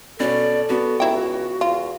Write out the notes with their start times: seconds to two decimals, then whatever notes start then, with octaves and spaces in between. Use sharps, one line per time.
0.20 B2 C#4 A4 D5
0.69 B3 F#4 D5
1.00 C#2 F#3 E4 G5
1.61 E2 F4